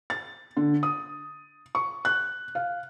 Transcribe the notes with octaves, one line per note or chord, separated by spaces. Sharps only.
A6
D3
D#6
C#6
F#6
F5